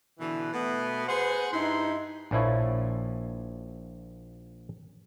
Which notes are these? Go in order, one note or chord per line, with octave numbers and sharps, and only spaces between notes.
B2 D3 E3
B2 A3 B3
G#4 B4 C5 F#5
G2 D#4 E4 C6
A#1 A#2 F3 E4 C#5